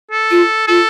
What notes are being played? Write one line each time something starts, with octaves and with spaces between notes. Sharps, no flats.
A4
F4
F4 A4